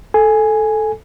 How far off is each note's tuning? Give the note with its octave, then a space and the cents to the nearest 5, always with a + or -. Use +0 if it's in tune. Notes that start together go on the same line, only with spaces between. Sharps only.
A4 -10 G#5 +0